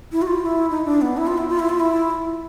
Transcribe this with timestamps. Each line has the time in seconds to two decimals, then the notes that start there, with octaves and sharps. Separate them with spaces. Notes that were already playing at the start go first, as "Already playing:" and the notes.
0.12 E4
0.22 F#4
0.27 F4
0.45 E4
0.70 D#4
0.85 D4
1.01 B3
1.17 E4
1.27 F4
1.38 E4
1.49 F4
1.59 E4
1.69 F4
1.80 E4